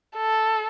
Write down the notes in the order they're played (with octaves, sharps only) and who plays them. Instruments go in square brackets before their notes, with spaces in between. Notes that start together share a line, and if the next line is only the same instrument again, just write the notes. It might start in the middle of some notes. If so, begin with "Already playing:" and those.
[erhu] A4